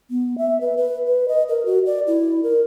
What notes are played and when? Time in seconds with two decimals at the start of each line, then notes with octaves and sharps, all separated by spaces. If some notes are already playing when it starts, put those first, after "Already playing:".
0.10 B3
0.38 E5
0.61 B4
0.77 B4
1.08 B4
1.28 D#5
1.49 A#4
1.66 F#4
1.86 D5
2.07 E4
2.43 A#4